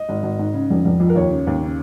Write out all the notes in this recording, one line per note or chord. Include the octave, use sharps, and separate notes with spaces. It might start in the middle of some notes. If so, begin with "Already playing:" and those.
Already playing: D#5
G#1
G#1
G#2
C#3
F1
F1
F2
A#4
D#2 C#5
C#3
D#2
C#3